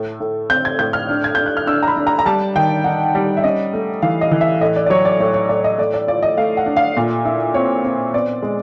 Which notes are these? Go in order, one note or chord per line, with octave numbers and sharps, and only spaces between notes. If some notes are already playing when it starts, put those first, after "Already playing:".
Already playing: A2 A3
A2
C4 G6
G#6
A2 G6
F6
D4
G#6
D4 G6
F#6
F6
D4 E6
A#5
B5
D4
A#5
A#5
G3 A5
D#3 G5
D#4 F#5
G3
E5
C#4 D#5
A3
E3 F5
D#5
E3
E5
A2 D#5
D5
D5
F#3 C#5
D5
A2 C#5
C#5
A2 D5
D#5
A3 D5
D5
F4 D5
D#5
A3 F5
F#5
D4
F5
A#2
E4
C4 C#5
C4
B3 D5
G#3